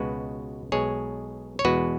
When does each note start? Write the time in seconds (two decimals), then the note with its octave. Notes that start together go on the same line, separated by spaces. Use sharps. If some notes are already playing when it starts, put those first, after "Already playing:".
Already playing: C#2 B2 G#3 F#4 B4
0.72 B1 B2 G#3 G#4 C#5
1.59 C#5
1.65 E2 B2 G#3 F#4 B4